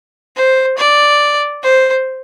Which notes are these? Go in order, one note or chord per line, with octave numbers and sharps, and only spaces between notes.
C5
D5
C5